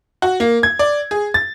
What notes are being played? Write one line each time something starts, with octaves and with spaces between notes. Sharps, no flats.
F#4
A#3
G#6
D5
G#4
A6